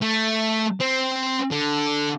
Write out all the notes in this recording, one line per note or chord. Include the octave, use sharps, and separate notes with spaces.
A3
C4
D3